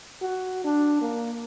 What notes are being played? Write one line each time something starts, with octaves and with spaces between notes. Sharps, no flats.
F#4
D4
A#3